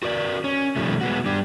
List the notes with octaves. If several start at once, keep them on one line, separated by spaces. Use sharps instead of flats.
F#4 A#4 D5
C#4
B2 D#3 F3 G3 A3
G#3 B3 F#4
G3 D4